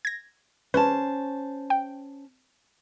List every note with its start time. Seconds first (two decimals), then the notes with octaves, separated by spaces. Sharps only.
0.05 G#6 A#6
0.74 C#4 B4 C5 A5
1.70 G5